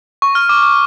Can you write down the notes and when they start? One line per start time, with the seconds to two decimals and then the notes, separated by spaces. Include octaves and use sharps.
0.22 C#6
0.35 F6
0.49 D6
0.63 D6